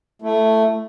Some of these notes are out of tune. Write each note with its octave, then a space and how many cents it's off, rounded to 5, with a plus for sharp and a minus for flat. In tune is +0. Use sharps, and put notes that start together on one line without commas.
A3 +5 E4 +25